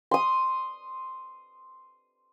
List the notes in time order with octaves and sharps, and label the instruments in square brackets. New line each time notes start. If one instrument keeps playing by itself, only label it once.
[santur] C6 D#6